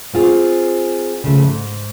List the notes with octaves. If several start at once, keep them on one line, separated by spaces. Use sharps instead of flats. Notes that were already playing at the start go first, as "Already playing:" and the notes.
C4 F4 G#4
C#3 F3 A3
G#2